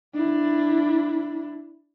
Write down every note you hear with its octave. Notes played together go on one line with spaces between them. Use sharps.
D4 E4